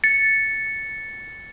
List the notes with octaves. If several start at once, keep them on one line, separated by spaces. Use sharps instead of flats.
A6 C#7